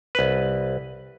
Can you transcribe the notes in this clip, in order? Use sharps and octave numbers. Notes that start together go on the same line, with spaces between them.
C2 B4